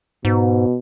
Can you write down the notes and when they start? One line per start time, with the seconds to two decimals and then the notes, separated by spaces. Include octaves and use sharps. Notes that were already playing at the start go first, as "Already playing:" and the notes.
0.25 G#2 B2